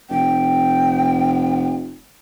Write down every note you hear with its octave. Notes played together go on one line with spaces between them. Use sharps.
F1 G5